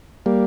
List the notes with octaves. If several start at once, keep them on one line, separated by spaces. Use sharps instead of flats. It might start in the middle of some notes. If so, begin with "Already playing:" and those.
G3 A#3